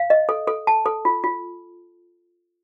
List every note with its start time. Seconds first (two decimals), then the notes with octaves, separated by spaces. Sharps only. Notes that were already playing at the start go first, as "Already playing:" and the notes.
Already playing: F5
0.10 D#5
0.29 A4
0.48 A4
0.67 A5
0.86 A4
1.05 F4
1.24 F4